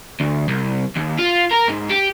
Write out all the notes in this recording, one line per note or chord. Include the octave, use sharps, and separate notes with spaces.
D2
C2
D#2
F4
A#4
G#2
G4